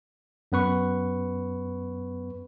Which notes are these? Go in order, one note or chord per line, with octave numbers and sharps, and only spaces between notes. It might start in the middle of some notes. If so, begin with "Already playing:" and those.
F#2 B3 B4 C#6